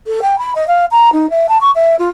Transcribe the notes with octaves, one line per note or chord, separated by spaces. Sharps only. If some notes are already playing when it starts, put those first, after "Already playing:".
A4
G5
B5
D#5
F5
A#5
D#4
E5
A5
C#6
E5
F4